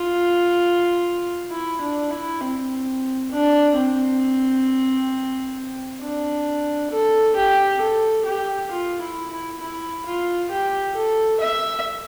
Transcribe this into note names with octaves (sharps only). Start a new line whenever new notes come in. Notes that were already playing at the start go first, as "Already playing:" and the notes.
Already playing: F4
E4
D4
E4
C4
D4
C4
D4
A4
G4
A4
G4
F4
E4
E4
E4
F4
G4
A4
E5